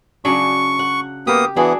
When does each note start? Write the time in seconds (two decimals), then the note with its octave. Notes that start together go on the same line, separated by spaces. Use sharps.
0.25 C#3 F#3 D4 C#6
0.79 F#5
1.27 A#3 B3 G4 D#6
1.56 E3 B3 D4 F#4 G#4